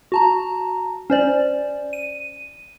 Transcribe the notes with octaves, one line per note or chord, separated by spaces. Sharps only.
F#4 A5 A#5
C#4 C5 D5
D#7